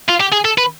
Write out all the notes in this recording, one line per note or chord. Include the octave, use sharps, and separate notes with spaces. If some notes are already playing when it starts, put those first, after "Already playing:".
F4
G4
G#4
A4
B4